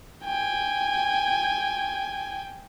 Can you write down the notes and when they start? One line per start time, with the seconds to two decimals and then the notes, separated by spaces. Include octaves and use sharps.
0.24 G5 G#5